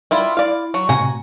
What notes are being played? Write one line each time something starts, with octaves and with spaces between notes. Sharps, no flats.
G3 E4 F4 C6
E4 D5 F5
F#3 C#6
A2 C3 F#4 G#5 A#5